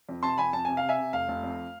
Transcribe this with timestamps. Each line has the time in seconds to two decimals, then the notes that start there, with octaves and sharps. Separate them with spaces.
0.09 F2
0.23 C3 A5 C6
0.38 F2 G#5 B5
0.53 F2 A5
0.65 C3 G#5
0.77 F5
0.83 C3
0.89 E5 G#5
0.98 C3
1.13 F1 F5
1.28 F1
1.43 F2